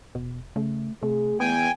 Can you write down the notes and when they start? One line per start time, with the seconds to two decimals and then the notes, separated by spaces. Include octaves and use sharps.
0.15 E1 B2
0.56 C#3 A3
1.03 C3 A3 G#4
1.40 E2 B3 G5 G#5